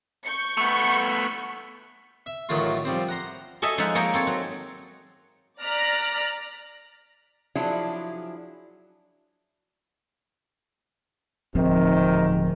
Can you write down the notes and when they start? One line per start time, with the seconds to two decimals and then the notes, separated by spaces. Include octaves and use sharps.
0.24 C#6 G6 C#7
0.57 A3 B3
2.26 E5
2.49 A1 D#3 F#3 A3 F4 C6
2.85 F3 G3 C4
3.09 F#5 A#5 C6
3.62 G#4 A4 C#5 D#5 E5 G#5
3.78 F3 G#3 D#4 E5 F#5
3.95 A#3 D#4 G#4 C#5 G5 A#5
4.14 C4 A4 C#5
4.27 F#3
5.60 D5 A#5 F6 F#6 A#6 B6
7.55 F3 F#3 D4 E4 G#4
11.55 D1 G#2 C3 D#3 F3 C4